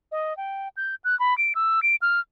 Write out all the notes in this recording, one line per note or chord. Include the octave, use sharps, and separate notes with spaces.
D#5
G5
G6
F#6
B5
D7
E6
D7
F6